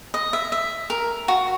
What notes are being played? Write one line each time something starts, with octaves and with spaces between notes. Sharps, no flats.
D#5
E5
E5
A#4
F#4